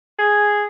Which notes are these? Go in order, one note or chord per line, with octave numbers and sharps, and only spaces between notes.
G#4